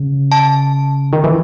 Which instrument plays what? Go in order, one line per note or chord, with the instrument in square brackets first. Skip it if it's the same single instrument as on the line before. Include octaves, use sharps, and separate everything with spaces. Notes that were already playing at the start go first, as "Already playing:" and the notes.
Already playing: [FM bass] C#3
[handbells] A5
[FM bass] D#3
E3